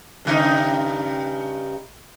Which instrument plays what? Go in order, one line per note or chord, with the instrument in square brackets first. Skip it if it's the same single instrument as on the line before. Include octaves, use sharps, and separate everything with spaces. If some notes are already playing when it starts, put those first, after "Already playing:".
[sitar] G2 C#3 D#4